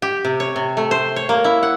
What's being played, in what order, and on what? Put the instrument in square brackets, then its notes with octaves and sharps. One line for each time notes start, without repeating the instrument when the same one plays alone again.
[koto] G4
C3
C#5
C3
A3
C5
C#5
A#3
E4
F#5